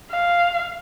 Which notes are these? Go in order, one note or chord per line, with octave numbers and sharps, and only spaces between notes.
F5